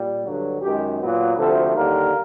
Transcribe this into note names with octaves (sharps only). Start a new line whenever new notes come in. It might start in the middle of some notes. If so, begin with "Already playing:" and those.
Already playing: A#2 G3
G2 D3 F#3
F#2 D#3 G#3 G4
A#2 F#3 B3
D2 C3 F3 A3 A4
D#2 D3 G3 A#3 A#4